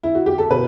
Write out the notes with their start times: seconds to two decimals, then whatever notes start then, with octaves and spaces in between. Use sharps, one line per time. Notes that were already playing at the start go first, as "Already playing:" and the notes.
0.03 E4
0.15 F#4
0.26 G4
0.38 A4
0.50 B2 B4